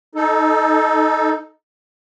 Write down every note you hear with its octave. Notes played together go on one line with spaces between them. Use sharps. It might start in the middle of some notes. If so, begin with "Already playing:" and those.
D#4 A4